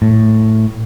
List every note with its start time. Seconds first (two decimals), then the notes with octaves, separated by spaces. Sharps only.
0.02 A2